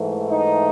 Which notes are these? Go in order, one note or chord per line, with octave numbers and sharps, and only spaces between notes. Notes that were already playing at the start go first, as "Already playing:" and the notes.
Already playing: G#2 E3 A3
D#4